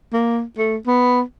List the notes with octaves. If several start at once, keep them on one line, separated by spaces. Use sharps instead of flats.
A#3
A3
B3